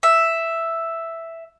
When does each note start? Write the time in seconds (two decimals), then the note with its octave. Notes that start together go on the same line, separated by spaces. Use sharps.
0.03 E5